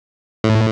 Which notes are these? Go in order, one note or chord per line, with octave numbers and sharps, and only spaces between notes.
A2